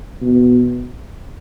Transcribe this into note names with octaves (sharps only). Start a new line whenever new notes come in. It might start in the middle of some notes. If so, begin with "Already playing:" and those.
B2